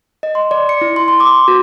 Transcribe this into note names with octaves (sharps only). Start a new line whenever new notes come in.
D#5
C6
D5
C#7
E4
C6
C6
D6
F#4